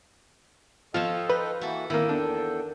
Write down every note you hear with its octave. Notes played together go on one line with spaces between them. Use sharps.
F3 F4 A4 C#5 D#5 G5 A5
D#4 B4
E3 A#3 E4 F#4 A4
A2 D#3 A#3 E4
E2 D4 A4 G5